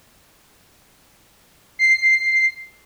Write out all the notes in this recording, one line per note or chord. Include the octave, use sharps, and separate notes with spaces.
C7